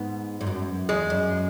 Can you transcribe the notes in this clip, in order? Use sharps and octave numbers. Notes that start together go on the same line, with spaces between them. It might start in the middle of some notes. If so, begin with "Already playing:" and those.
Already playing: G#2 B3
G#2
F#2
E2 G#3
F#2